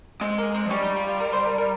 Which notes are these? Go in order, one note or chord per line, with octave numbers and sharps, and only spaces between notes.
G#3 C4
A#3
C4
F3
G3 C#4
D#4
F4
F4
A#4
C5
A#4
A#4